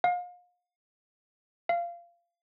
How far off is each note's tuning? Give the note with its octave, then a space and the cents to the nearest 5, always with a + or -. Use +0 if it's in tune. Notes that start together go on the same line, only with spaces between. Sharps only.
F5 +35
F5 -20